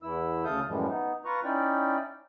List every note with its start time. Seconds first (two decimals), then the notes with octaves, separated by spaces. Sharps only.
0.03 E2 E3 E4 E6
0.45 D2 C#3 A4 F5 D#6 G6
0.67 F#2 A2 E3 F3 G3 G#3
0.88 B3 D#4
1.25 F4 B4 A#5 C#6
1.45 C#4 D#4 E4 D5 G5